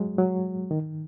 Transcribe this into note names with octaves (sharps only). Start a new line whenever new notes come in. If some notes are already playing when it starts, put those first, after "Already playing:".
Already playing: F#3 G#3
F#3
D#3